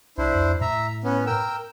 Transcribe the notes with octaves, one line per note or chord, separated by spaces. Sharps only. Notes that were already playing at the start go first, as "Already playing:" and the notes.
C2 D4 E4 C5
F2
A2 E5 A#5
B3 C#4
A#4 G5 E6